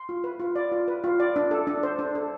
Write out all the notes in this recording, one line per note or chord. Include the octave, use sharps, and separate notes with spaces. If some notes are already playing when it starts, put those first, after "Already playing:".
Already playing: C6
F4
B4
F4
D5
F4
B4
F4
D5
D4
A4
D4
C5
D4
A4